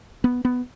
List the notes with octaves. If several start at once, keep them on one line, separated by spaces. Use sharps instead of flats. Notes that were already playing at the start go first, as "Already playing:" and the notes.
B3
B3